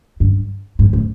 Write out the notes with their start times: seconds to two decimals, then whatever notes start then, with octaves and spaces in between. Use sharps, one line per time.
0.20 G2
0.79 G#2
0.93 A2